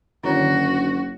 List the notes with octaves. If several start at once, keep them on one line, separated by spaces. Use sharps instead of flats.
F#1 D3 D#3 D4 E4 F#4 C#5